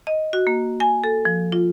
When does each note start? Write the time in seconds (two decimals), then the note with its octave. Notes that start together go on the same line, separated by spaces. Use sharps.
0.07 D#5
0.33 F#4
0.47 A#3
0.80 G#5
1.04 A4
1.25 F3
1.52 F4